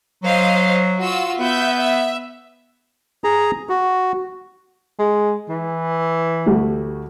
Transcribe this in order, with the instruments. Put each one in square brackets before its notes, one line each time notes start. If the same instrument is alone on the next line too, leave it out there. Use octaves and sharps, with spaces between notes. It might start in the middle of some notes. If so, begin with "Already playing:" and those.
[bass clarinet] F#3 [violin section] C5 D#5 F5
[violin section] F4 F#4 E6
[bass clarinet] B3 [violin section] E5 G6
[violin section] E5
[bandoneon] G#4 A#5
F#4
[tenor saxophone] G#3
E3
[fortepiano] D2 G3 A3